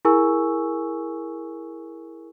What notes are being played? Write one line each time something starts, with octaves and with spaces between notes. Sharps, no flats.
E4 G#4 A#4 G#5 C#6 E6